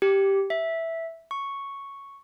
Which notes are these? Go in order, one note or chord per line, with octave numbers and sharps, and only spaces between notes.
G4
E5
C#6